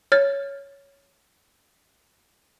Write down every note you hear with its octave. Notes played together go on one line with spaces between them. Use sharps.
C#5 F6 A6